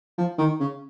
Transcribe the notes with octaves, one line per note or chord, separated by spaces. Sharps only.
F3
D#3
C#3